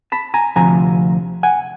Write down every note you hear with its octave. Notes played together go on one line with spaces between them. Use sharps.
A5 B5
G#5 A#5
D2 C3 F3 G#5 A#5
F#5 G#5